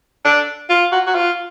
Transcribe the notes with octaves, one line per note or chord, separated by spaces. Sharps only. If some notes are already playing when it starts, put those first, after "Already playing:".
D4
F4
F#4
F#4
F4